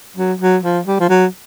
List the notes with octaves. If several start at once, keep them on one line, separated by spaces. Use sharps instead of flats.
F#3
F#3
F3
G3
F3
F#3